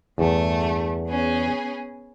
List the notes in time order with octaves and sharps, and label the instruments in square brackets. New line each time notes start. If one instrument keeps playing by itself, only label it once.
[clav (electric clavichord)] E2 [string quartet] G2 A3
[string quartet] B3 C#4 G#4